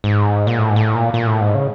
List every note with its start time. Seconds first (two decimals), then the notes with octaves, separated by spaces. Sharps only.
0.04 G#2
0.47 A#2
0.58 A2
0.70 G#2
0.76 A2
0.95 A#2
1.14 A#2
1.27 A2
1.41 G#2
1.55 C#3